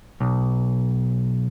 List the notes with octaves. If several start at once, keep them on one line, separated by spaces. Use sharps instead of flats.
B1